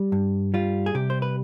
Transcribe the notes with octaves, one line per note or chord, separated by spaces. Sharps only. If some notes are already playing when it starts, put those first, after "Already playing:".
Already playing: G3
G2
G3 F4
G#4
C3 G4
C5
B4